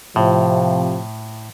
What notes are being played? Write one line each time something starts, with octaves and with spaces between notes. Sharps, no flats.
A2 C3 F3